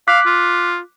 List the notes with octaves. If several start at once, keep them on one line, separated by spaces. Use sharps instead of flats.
F5 D6 F#6 B6
F4